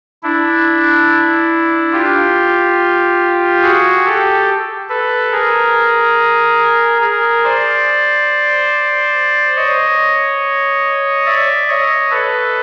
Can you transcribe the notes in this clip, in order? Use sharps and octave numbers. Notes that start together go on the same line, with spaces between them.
D4 E4
F4 G4
F#4 G#4
G4 A4
A4 B4
G#4 A#4
G#4 A#4
C5 D5
C#5 D#5
D5 E5
C#5 D#5
A4 B4